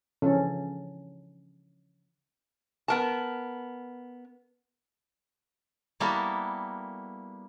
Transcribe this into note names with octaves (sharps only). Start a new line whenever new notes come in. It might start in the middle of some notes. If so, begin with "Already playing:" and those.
C#3 E3 F3 C#4 D4 A4
B3 A#4 A5
G3 A#3 B3 E4 F#4 A4